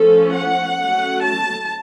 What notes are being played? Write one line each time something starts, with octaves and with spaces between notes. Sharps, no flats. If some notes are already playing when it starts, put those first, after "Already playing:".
Already playing: F3 A3 C#4 A4
F#5
F#3 A3 C#4
A5